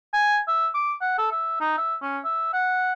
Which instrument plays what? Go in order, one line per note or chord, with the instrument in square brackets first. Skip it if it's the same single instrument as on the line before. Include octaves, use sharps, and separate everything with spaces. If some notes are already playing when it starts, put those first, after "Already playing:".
[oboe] G#5
E5
D6
F#5
A4
E5
D#4
E5
C#4
E5
F#5